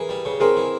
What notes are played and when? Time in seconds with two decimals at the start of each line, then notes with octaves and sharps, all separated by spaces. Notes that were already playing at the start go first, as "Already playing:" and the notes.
Already playing: E3 G#4 A#4
0.09 G3
0.25 C#3
0.40 C4 G#4 A#4
0.57 E3